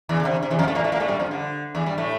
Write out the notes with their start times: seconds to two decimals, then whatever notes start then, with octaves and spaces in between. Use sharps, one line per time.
0.09 E2 E3
0.19 D3
0.25 C3
0.43 C3
0.50 E2 E3
0.59 F2 F3
0.68 A2 A3
0.75 A#2 A#3
0.84 A2 A3
0.92 A#2 A#3
1.00 A2 A3
1.08 G2 G3
1.19 F2 F3
1.31 D3
1.75 E2 E3
1.86 G2 G3
1.98 A2 A3